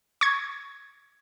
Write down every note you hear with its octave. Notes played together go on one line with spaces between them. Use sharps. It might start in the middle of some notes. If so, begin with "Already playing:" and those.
C#6 G#6